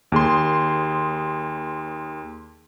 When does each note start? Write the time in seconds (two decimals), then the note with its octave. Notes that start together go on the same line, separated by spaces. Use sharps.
0.12 D#2 G#4 C6